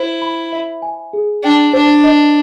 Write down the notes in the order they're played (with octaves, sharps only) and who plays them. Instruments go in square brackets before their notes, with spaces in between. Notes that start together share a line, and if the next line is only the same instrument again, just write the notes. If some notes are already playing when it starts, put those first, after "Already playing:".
Already playing: [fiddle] E4 [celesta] C5
[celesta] B5
E5
G#5
G#4
[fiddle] D4 [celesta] G5
[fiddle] D4 [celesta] C5
[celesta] D#5